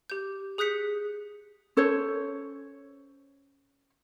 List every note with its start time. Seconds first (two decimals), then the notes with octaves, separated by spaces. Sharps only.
0.10 G4 G6
0.58 G#4 D#6 F#6 G6 B6 C#7
1.77 C#4 A4 C5 C#5